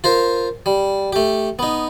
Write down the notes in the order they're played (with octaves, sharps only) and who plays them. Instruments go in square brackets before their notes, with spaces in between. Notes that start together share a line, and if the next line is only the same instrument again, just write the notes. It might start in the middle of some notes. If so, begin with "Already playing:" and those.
[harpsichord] F4 A#4 C5
G3
A3 G4
B3 D#4